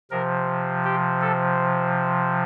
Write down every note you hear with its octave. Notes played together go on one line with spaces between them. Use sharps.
C3 F3 A#4
G4
A4